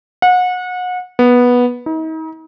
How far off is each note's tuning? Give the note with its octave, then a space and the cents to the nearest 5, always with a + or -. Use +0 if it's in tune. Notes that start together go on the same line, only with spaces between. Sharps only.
F#5 -30
B3 -10
D#4 +40